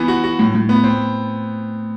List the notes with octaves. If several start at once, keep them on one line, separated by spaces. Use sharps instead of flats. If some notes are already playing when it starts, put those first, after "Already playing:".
Already playing: E3 B3
F#4
F#4
A2
A2
B3
C4